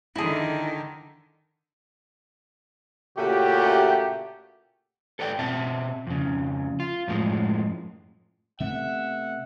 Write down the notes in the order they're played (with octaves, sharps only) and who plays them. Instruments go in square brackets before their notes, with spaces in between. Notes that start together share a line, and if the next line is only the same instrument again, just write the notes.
[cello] D3 D#3 [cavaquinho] E4 G#4
[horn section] A#2 C#3 A3 F#4 G4
[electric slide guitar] A4 B4 D5 F#5 G5
B2 C4 E5 A5
F2 C#3
F4
F#2 A2 F3 G#3
[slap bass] C3 A3 B3 [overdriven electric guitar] E5 [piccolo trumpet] F#5